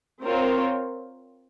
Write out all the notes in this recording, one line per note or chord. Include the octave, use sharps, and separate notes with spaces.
C4 F4 A#4 C#5